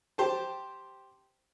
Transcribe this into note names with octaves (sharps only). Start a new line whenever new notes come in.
G4 C5 A5